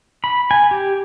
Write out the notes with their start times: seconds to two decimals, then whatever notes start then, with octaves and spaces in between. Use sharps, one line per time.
0.24 B5
0.51 G#5
0.71 G4